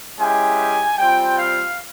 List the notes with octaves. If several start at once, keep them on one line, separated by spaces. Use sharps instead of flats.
G#3 C#4 E4 G4 G#5
G3 C4 F4 G5
F5